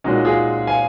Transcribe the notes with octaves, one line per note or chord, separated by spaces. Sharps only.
A#2 G#3 C#4 D#4 F#4
F4 G#4
F5 G#5